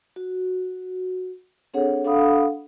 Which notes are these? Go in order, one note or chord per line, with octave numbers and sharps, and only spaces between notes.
F#4
C4 D4 G#4 A4 C#5 F#5
D4 A4 F5 F#5 B5 D#6